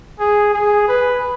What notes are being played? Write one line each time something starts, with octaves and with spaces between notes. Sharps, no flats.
G#4
G#4
B4